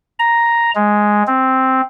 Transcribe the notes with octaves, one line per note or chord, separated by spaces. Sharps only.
A#5
G#3
C4